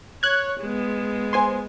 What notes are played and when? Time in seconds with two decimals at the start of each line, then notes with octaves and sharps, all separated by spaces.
0.23 C#5 F#6 G#6
0.61 G#3 B3
1.33 C5 G#5 C6